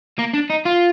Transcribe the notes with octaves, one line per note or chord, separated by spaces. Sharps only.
A#3
D4
D#4
F4